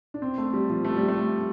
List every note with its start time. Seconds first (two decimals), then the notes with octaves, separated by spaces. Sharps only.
0.14 D4
0.22 C4
0.38 A3
0.53 G3
0.69 F3
0.85 A3
0.96 G3
1.08 A3